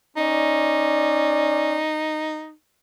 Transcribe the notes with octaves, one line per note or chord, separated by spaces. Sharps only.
C#4 D#4 D5